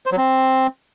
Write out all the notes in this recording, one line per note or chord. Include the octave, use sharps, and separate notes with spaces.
C5
F#3
C4